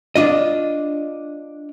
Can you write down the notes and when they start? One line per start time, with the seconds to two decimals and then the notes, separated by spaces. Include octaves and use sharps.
0.16 D4 F4 D#5